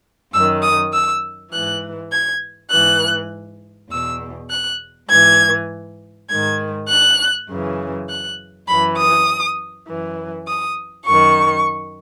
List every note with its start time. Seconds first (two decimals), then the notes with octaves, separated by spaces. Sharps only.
0.32 F#2 D#3 E6
0.62 D#6
0.92 E6
1.52 G#2 E3 F#6
2.12 G#6
2.71 G#2 E3 F#6
3.90 E2 B2 E6
4.50 F#6
5.09 G#2 E3 G#6
6.29 G#2 D#3 G#6
6.88 F#6
7.48 F#2 C#3 E3
8.08 F#6
8.68 F#2 E3 B5
8.98 D#6
9.87 F#2 E3
10.47 D#6
11.06 F#2 D#3 C#6